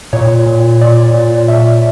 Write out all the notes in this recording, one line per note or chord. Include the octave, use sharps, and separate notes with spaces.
A#2 C#5
A#2
A#2 D5
A#2
A#2 E5